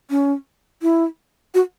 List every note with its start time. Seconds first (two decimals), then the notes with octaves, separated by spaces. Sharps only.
0.10 C#4
0.82 E4
1.54 F#4